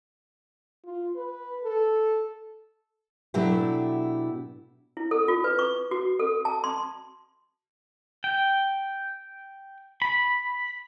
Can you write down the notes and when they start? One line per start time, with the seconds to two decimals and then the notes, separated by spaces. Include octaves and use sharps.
0.85 F4
1.16 B4
1.63 A4
3.34 B2 F#3 A3 D4 E4 G4
4.97 E4
5.11 A4
5.28 F4
5.44 B4
5.59 C#6
5.91 F#4
6.19 A4
6.45 A5
6.64 C6
8.24 G5
10.02 B5